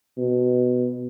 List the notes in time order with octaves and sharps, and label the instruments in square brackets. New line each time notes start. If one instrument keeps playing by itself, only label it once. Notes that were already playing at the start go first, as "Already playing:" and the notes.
[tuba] B2